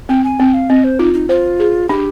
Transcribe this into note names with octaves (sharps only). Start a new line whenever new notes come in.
C4 G5
G#5
C4 G5
F5
C4 D#5
C5
D#4 F4
D#4
F4 C5
G#4
D4 G4